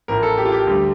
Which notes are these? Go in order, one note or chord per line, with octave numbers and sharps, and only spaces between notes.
A1 A2 F3 A#4
A4
G4
F4
G4
D2 D3 G3